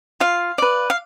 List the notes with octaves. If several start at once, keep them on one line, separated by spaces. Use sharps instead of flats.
F4 F5
B4 D5
F5